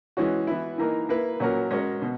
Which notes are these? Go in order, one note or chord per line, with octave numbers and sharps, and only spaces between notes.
E3 G#3 C#4 F#4
E3 B3 E4
E3 A#3 D#4 A#4
A#3 E4 B4
A#2 F#3 C#4 F#4 A#4
G#3 C#4 F#4 A#4 C#5
B2